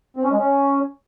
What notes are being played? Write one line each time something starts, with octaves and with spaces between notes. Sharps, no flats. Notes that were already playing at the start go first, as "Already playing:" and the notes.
C4
C#4
G#3
C#4